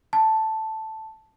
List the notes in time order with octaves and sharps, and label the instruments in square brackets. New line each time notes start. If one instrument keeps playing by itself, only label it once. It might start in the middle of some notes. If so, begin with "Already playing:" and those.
[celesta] A5